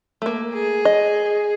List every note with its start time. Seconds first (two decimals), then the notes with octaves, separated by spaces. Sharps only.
0.22 A3 A#3
0.53 G#4
0.85 D#5